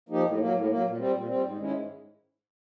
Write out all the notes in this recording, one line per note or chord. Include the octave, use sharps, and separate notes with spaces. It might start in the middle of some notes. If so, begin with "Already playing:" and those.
F3 A#3 D#4 G4
A2
F#3 A#3
A2
F#3 A#3
A#2
G3 C4
A#2
G3 C4
G#2
D#3 G#3 C#4 E4
G#2